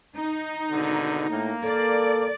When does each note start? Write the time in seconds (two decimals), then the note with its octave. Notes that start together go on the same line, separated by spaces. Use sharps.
0.16 D#4
0.71 G#1 B2 D3
1.31 A2 A#3
1.64 A4 D5